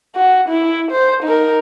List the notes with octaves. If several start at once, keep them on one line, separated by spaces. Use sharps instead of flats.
F#4
E4
C5
D#4 A#4